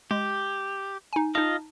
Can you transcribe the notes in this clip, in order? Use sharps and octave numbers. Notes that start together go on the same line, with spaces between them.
G#3 G4
D#4 G#5
D#4 F4 D#5 F5 A5